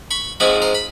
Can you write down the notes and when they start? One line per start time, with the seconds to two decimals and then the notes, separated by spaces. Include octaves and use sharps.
0.11 B5 C#6
0.40 G#2 F3 G#3 C4 B5 C#6
0.62 A#5 C6
0.75 B5